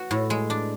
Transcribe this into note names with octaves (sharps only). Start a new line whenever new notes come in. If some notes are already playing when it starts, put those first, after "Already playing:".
Already playing: F#4
A2
G#3
D4